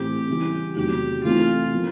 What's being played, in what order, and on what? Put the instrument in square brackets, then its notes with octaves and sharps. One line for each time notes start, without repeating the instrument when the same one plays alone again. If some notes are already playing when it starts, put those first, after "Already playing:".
Already playing: [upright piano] A2 E3 A3 C4 [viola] G4
[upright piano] C#3 E3 G3
[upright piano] E2 C3 D#3 F#3 A3 [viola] G4
[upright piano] C3 E3 A3 C4 D#4 [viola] F4
[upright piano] F3 A#3